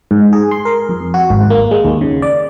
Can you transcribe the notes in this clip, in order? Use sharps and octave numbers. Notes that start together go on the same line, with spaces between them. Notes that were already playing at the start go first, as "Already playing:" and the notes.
G#2
G#4
C6
A#4
F2
F#4
G#1
A#3
G#3
D#2
C#3
D5